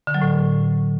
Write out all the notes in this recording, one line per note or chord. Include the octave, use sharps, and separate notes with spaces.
D3
F#3
A2